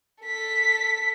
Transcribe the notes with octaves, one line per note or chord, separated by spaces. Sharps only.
A4 B6